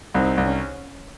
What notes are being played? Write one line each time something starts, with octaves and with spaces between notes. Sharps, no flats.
C2 C4 D#4
C2
C#4